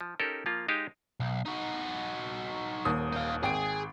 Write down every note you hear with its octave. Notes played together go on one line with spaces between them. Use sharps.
F3
C#4 D#4 G4 A4 A#4
F3 A#3 F4
G#3 D#4 G4 F5
B1
D#4 F#4
D#1 D#2 D#6
D#4 F5
G#1 G#4 G5 D7